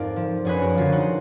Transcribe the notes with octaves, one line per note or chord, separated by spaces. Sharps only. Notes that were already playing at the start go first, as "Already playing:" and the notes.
Already playing: F2 G#2 A#4 D5
F3
F#2 G#4 B4
F#4 A#4
D3 F3 F4 G#4
D#4 F#4